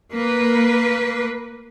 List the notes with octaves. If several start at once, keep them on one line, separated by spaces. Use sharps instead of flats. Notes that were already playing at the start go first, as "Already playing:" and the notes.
A#3 B4